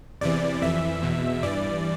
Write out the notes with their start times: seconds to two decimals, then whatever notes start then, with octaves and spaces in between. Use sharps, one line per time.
0.21 E2 C3 E3 D5
0.61 F2 E3 E5
1.02 E2 B2
1.42 G2 E3 D5